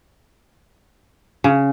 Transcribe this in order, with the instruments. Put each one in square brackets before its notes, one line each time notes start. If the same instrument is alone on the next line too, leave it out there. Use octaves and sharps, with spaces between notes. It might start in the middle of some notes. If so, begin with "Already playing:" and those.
[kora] C#3